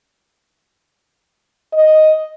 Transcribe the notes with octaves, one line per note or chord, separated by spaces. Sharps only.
D#5